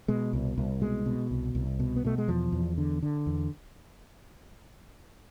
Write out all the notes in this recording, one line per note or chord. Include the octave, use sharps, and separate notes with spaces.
B2 G#3
C2
C2
B2 G#3
B2
C2
C2
B2
B3
B2 A3
G#3
E2 F3
E2
D3
D3
E2